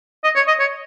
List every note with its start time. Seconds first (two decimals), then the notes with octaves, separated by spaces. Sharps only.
0.24 D#5
0.35 C#5
0.48 D#5
0.60 C#5